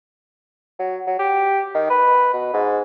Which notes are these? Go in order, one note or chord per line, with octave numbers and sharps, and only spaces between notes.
F#3
F#3
G4
D#3
B4
B2
G#2